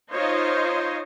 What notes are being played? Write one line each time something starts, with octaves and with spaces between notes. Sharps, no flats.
D#4 F4 C5 C#5 D#5